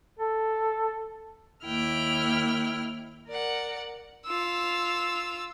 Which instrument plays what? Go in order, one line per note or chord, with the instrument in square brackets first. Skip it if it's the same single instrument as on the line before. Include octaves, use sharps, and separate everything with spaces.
[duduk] A4
[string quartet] D#2 A#3 E4 G5 F6
A#4 D5 F#5
[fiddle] F4 E6